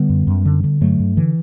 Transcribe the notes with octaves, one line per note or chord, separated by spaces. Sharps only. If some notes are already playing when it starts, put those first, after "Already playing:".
Already playing: D3 G3 B3
F#2
F#2
D3
D3
G2 F#3 A3
G2
D3 E3